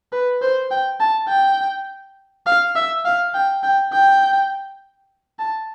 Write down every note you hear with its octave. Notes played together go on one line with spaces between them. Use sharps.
B4
C5
G5
A5
G5
F5
E5
F5
G5
G5
G5
A5